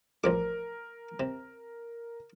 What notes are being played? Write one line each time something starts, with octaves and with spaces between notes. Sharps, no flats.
A1 F3 A#4 D6
C3